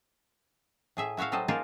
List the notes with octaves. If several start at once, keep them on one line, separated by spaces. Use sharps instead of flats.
A2 G#4 E5
E4 F#4 C#5 E5 F5
F#3 G3 A4 C5 D#5
A#3 D#4 F4 G#4 A#4 A5